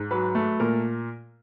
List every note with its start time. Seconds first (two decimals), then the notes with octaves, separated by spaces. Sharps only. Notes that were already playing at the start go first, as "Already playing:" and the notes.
Already playing: G#2
0.11 F#3 B4
0.35 A3
0.60 A#2 A#4